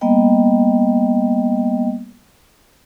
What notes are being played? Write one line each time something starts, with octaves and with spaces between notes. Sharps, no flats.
G3 A#3 B3 D#5 G5